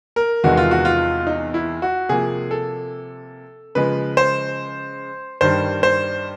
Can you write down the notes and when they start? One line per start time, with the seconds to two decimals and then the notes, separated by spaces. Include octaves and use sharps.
0.16 A#4
0.44 E2 C3 D#3 G#3 B3 F#4
0.57 F4
0.71 F#4
0.85 F4
1.27 D#4
1.54 E4
1.82 F#4
2.09 C3 F3 A#3 G#4
2.51 A4
3.75 C#3 F3 G#3 B4
4.17 C5
5.41 G2 D#3 G3 C5
5.83 C5